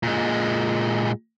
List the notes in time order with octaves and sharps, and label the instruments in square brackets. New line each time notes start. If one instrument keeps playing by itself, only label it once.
[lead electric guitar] A#2 G#3